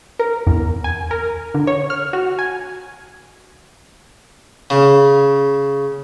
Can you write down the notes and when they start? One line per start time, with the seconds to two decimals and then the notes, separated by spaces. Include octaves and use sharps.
0.19 A#4
0.47 E2
0.84 G#5
1.11 A#4
1.54 D3
1.67 C#5
1.90 F6
2.13 F#4
2.39 G#5
4.70 C#3